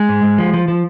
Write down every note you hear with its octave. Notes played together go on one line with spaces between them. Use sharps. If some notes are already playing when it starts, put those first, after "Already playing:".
Already playing: G#3
G#2
G#2
F3
F3
F3